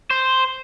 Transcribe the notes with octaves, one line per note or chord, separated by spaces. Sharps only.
C5